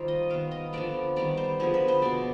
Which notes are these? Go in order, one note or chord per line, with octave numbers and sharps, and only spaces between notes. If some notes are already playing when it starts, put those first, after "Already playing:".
Already playing: C3 D#3 G3 C4 D#4 F4
D#5
D#3 B3 F5
D#5
D3 F3 B3 D5
D#3 G3 B3 D5
C5
D3 F3 B3 G#4
B4
C5
B2 B3 D5